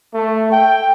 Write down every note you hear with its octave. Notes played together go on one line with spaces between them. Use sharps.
A3
G5